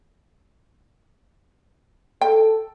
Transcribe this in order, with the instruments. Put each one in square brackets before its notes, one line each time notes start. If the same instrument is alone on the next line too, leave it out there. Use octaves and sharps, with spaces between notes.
[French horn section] A4 [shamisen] G5